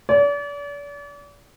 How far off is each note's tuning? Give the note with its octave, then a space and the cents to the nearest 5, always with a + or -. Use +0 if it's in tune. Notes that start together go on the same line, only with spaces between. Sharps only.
D5 -40